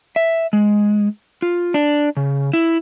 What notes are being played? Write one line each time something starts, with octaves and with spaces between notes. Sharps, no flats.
E5
G#3
F4
D4
C#3
E4